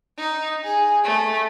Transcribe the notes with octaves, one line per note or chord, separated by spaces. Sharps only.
D#4
G#4
A3